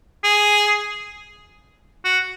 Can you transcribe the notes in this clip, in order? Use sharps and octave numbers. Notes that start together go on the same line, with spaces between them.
G#4
F#4